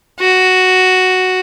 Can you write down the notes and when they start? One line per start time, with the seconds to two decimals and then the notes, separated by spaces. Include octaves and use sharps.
0.20 F#4